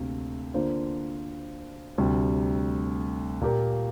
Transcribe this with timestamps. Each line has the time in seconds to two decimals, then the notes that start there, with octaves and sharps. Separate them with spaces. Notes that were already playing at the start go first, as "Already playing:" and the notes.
Already playing: D2 C3 A#3
0.54 D3 A#3 F4 C5
1.98 D2 C3 G3
3.41 A#2 A#3 G4 A#4